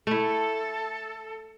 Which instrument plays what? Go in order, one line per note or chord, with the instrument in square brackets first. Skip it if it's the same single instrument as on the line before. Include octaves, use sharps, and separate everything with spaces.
[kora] A3 E4 [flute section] A4